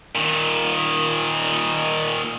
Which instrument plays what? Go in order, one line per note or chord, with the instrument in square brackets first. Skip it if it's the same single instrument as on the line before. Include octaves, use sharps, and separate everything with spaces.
[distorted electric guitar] A#2 D#3